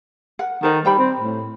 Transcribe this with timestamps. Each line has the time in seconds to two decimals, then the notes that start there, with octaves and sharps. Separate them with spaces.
0.39 A#4 F#5
0.63 D#3 A4 C5 D#5
0.85 G3 C5 G5 B5
0.98 C4
1.19 A2